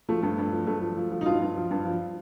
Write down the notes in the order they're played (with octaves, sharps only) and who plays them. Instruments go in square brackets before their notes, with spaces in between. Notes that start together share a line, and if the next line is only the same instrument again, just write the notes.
[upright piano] F3 A3
G2
G2
F3
G2 A3
F3
F3
F3
D#4
G2 F4
G2
F3
G2
F3